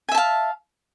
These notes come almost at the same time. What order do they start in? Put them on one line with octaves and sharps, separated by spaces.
G#5 E5 A5 F5